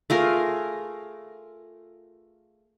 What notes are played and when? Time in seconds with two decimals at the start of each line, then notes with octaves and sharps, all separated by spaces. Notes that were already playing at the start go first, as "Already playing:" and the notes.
0.10 A3 F4 G#4 A#4